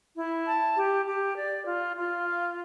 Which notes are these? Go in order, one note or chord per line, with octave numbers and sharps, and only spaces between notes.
E4
A5
G4
G4
D5
F4
F4
F5